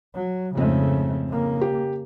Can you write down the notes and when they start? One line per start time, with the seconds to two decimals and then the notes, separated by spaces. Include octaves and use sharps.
0.15 F#3
0.55 F2 G#2 C#3 A3 C4
1.29 C#3 A#3
1.61 G4